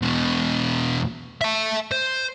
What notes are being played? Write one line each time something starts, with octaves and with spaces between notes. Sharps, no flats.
E2 B2
E5 A5
C5